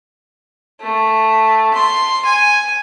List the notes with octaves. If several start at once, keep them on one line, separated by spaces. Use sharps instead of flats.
A3
C6
G#5